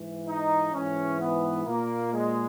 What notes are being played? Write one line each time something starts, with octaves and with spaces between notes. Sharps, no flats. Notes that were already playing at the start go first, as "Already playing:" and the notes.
Already playing: G#2 E3
D#4
G#2 E3 C#4
B3
A#2 A#3
G#3